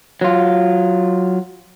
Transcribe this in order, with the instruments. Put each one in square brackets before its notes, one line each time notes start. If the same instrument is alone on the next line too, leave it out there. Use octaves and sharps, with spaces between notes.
[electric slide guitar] F#3 F4